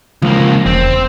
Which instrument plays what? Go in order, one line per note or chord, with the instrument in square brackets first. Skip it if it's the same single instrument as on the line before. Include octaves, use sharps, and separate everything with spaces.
[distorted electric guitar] C#2 A#3 [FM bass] F3
[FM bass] E1 [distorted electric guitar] C4